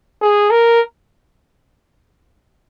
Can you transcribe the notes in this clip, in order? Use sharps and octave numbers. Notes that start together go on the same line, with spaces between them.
G#4
A#4